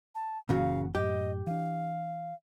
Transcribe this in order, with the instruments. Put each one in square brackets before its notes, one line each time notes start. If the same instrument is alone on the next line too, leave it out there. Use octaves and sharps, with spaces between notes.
[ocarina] A5
[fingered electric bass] F#1 E3 A#3 [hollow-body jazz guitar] A#2 C#3 F#4 [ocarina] F5
[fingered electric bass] F#2 A2 [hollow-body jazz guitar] G4 [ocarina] D#5
[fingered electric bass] E3 D4 [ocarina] F5